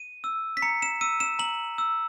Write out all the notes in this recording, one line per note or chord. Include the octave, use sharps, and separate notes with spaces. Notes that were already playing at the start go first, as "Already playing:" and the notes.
Already playing: D#7
E6
B6
A#5 C#7
E7
E6 D#7
E7
A#5 F#7
E6